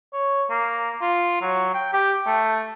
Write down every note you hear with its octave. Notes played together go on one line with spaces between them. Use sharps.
C#5
A#3
F4
F#3
G5
G4
A3